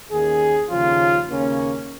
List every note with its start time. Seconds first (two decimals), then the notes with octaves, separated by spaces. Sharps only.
0.11 D#2 D#3 A#3 C#4 G#4
0.70 D#2 C#3 F3 C#4 F4
1.29 D#2 C#3 A#3 C#4